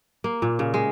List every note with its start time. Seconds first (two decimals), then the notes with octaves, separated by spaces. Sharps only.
0.24 A#3
0.42 A#2
0.59 C#3
0.74 G#3